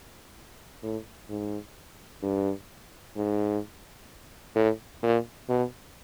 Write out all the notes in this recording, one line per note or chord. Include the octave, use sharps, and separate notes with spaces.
A2
G#2
G2
G#2
A2
A#2
B2